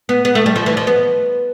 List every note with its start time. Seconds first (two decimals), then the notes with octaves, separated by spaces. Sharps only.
0.09 B3
0.25 B3
0.35 A3
0.46 G3
0.56 F3
0.66 E3
0.77 F3
0.87 B3